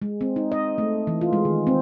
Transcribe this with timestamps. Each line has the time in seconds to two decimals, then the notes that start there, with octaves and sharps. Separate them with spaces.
0.02 G#3
0.21 C4
0.36 D#4
0.52 D#5
0.78 A3
1.07 E3
1.21 F4
1.33 G#3
1.45 D#3
1.67 C4